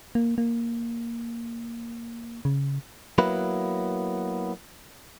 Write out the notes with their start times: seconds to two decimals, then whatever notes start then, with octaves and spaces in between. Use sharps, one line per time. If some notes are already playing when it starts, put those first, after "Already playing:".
0.15 A#3
0.38 A#3
2.45 C#3
3.18 F#3 A#3 B3 E4 B4